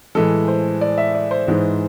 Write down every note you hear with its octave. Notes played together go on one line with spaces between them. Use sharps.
A2 E3 G#3 A4
C5
D5
E5
D5
C5
G#2 E3 G#3